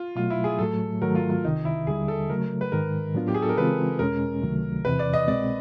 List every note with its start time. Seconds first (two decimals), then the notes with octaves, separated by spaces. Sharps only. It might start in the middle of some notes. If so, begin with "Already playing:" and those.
Already playing: F4
0.15 B2 F#3 A3 F4
0.30 E4
0.44 G#4
0.59 A2 F#3 A3 A4
1.01 G#2 D#3 F#3 A3 A#4
1.15 F4
1.30 F4
1.44 C2 C3 D#3 D#4
1.65 E4
1.86 D#2 D3 G3 G#4
2.08 A4
2.29 C#3 F#3 A3 A#4
2.61 B4
2.72 G#2 D#3 G#3 A#4
3.14 A2 F#3 B3 D4 F4
3.28 G4
3.34 G#4
3.42 A4
3.49 A#4
3.57 C#3 E3 G#3 C4 F4 B4
3.99 E2 B2 G#3 C#4 A#4
4.42 C#2 C3 D#3 F#3 A3
4.85 E2 C3 E3 B4
4.99 D5
5.13 D#5
5.27 C2 B2 G#3 C4 D5